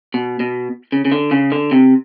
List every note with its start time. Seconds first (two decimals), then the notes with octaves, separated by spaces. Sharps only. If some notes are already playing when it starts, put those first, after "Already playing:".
0.14 B2
0.40 B2
0.92 C#3
1.05 C#3
1.12 D3
1.31 C#3
1.52 D3
1.71 C3